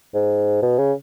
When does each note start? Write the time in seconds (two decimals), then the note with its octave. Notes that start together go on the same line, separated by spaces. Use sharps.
0.14 G#2
0.62 B2
0.79 C#3